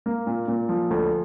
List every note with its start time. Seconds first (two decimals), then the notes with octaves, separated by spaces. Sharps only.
0.06 A#3
0.27 A#2
0.48 A#2
0.69 F3
0.90 D2